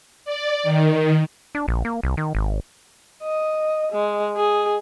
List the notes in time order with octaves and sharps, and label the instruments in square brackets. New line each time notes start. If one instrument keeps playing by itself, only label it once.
[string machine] D5
D#3
[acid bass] D4
A#1
A#3
C2
D#3
G#1
[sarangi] D#5
G#3
G#4